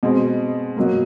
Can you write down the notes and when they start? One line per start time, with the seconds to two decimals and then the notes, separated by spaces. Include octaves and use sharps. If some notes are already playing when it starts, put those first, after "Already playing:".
0.03 B2 G#3 C4
0.77 B2 F#3 A#3